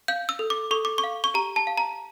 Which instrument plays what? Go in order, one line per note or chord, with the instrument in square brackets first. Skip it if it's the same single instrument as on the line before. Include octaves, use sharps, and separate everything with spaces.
[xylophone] F5 G6
E6
A4
D6
A4 C#6
D6
C#6
F5
C#6
G4 A#5
A5
F5
A#5